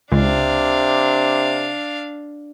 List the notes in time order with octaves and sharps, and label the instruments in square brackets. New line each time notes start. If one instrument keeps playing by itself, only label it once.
[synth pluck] C#2 [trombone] C3 [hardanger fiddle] D4 F5